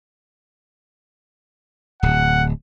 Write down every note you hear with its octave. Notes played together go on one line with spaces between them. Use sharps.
D1 F#5